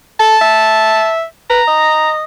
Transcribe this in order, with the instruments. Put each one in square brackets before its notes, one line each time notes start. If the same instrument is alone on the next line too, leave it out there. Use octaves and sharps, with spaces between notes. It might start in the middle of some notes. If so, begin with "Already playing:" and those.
[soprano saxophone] A4 [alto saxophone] A5
[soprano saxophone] E5
[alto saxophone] B4 [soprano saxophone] A#5
[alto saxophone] D#5